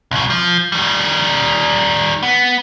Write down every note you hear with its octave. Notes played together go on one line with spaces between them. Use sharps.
C2 B2
F3
D#3 G3
B3